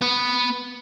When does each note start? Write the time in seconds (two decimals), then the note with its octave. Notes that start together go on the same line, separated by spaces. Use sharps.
0.02 B3